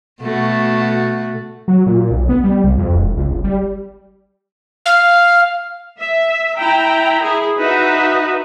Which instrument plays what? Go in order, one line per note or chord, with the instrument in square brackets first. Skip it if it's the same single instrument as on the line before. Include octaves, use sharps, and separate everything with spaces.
[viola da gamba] B2 A3 F#4
[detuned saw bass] F#3
A#2
B1
B3
G3
C2
F2
E1
C#2
G1
G3
[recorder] F5
[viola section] E5
E4 G5 A#5
E4 G#4
D#4 F#4 B4 E5